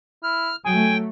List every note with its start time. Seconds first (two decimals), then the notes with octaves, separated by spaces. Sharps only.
0.23 E4 F6
0.66 F#3 A3 G5 G#5